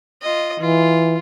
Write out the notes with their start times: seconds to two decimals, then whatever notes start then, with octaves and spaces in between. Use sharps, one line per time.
0.22 F4 D#5
0.60 E3 F4